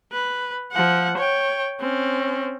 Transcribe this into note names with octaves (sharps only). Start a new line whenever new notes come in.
B4
F3 F#5
C#5 G5
C4 C#4